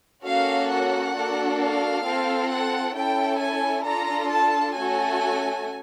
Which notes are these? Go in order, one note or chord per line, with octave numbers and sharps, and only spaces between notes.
A#3 C#4 F#4 A4 F5
F#5
A#3 D4 F#4 A4
F5
C4 F4 A4
F#5
C#4 E4 A4 G5
G#5
D4 F4 A4 A#5
A5
A3 C#4 F#4 A4 G#5